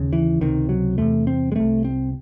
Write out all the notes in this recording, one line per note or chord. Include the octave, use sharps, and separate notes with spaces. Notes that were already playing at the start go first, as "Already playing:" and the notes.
Already playing: D#2 C#3
E3
C#2 C3 D#3
F#3
E2 C3 A3
C4
G#3
C2 C3 A3
C4